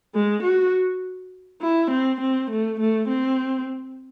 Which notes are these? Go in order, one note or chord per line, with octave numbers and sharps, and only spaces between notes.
G#3
F#4
E4
C4
C4
A3
A3
C4